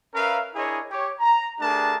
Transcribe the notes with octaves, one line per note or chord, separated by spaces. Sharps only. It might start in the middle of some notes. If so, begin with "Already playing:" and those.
C#4 A#4 B4 E5 F5
D4 E4 G#4 A#4 C#5 D#5
G4 C#5
A#5
A3 D4 G4 G#4 A#4 A5